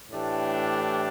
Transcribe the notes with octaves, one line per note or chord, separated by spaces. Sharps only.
A2 E3 A3 D4 G4